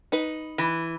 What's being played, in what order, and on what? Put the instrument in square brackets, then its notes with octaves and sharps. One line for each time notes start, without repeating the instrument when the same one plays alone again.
[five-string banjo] D#4 B4
[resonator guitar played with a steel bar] E3